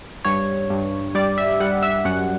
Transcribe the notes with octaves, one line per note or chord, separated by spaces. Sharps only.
G2 C#5
G2
G3 D5
E5
G3 F#5
E5
F#2 F#5